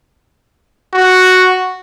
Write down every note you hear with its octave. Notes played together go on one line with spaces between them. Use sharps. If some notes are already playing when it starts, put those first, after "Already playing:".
F#4